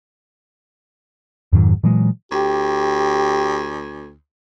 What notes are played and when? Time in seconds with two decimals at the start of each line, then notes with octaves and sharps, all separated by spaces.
1.53 F2 G#2 D#3 F#3
1.83 A#2 E3 F#3 G#3
2.32 D2 G4